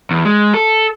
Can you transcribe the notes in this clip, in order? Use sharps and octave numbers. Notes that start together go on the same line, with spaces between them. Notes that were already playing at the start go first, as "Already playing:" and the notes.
E2
G#3
A4